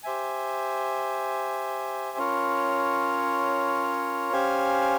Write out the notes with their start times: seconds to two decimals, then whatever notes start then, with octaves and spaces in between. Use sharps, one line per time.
0.03 G4 C5 E5 G#5
2.18 C#4 F4 A#4 C#5
4.33 C#4 G4 C5 F5 G#5